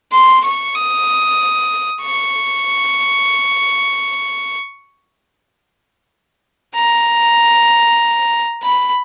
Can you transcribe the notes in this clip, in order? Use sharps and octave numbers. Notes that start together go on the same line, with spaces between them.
C6
C#6
D#6
C#6
A#5
B5